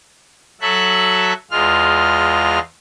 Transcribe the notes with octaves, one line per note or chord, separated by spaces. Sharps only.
F#3 A4 E5 F#6
E2 G#3 F4 F6